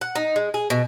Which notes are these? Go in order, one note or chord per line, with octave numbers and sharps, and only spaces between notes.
F#5
D#4
G#3
G#4
B2